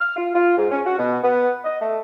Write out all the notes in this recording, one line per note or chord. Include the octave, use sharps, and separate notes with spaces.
F6
F4
F4
G#2
C#4
F#4
B2
B3
D#5
A3